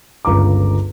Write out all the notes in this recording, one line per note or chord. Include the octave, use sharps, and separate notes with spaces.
G1 C#2 A#5 D6